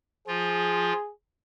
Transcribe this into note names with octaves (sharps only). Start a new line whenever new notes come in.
F3 F4 G#4